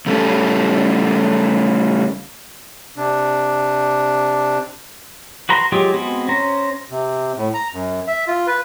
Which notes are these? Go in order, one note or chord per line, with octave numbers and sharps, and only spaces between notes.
C#3 G3 A3 A#3 C#4 A4
C3 D4
F#4 B4 A#5 C6
F#3 G#3 F4 G4 G#4
G#3 B3 C4 F#4
C#4 C5 A#5
C3
A2
A#5
F#2
E5
F4
B4